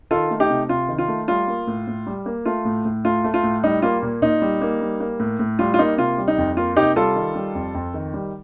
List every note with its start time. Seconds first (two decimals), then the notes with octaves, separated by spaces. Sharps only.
0.11 D#3 F4 A4
0.31 A3
0.40 D#4 G4
0.50 C3
0.69 C3 F4
0.88 D#3
0.98 F4
1.08 A3
1.28 G3 F4
1.48 A#3
1.67 A2
1.87 A2
2.07 G3
2.26 A#3
2.45 A3 F4
2.65 A2
2.85 A2
3.04 A3 F4
3.24 A3
3.34 F4
3.43 A2
3.64 G3 D#4
3.82 A#3 F4
4.02 A#2
4.22 A#2 D#4
4.42 G3
4.61 A#3
4.81 G3
5.00 A#3
5.20 A2
5.39 A2
5.59 G3 F4
5.74 F4
5.79 A#3 D#4
5.98 C3 F4
6.18 G3
6.28 D#4
6.38 F2
6.57 A#3 F4
6.76 C3 D#4 G4
6.96 G3 F4 A4
7.16 D#3
7.35 G3
7.55 F2
7.75 F2
7.94 D#3
8.14 G3